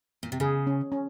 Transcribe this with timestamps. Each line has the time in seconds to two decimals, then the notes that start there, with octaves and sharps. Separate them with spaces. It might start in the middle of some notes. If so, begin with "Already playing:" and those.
0.23 A#2
0.32 C3
0.40 C#3 G#4
0.67 C#4
0.92 C#4